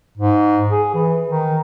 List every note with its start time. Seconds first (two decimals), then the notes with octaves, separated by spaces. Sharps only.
0.18 G#2
0.71 G#4
0.94 E3
1.29 D#3